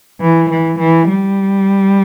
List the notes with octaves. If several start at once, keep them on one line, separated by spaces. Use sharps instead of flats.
E3
E3
E3
G3